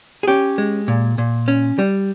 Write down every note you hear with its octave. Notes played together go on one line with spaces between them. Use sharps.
G#4
C#4 G4
G#3
A#2
A#2
C#4
G3